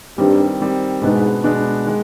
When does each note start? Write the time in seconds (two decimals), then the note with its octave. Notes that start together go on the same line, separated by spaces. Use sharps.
0.18 G2 D#3 G3 C4
0.60 D#3 G3 C4
1.02 G#2 B2 G#3 B3 D4
1.44 B2 G#3 B3 D4
1.85 D#3 G#3